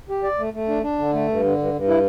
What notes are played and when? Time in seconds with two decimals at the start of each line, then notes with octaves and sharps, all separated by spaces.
0.09 G4
0.23 D5
0.39 A3
0.53 A3
0.68 D4
0.83 D4
0.99 D3
1.13 A3
1.28 G2
1.43 D3
1.58 G2
1.73 G2
1.88 E4